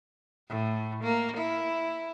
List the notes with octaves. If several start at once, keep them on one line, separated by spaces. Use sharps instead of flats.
A2
A#3
E4